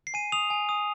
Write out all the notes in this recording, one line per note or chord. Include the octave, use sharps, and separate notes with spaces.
C7
G#5 D#7
D#6 F7
G#5
D#6